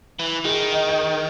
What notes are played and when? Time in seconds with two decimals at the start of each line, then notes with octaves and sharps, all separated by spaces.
0.19 E3
0.45 D#3 G#4
0.72 D#5
0.89 D#5